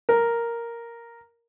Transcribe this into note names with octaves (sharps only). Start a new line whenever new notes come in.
A#4